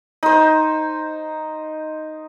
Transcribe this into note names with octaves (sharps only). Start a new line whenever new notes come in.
D#4 C5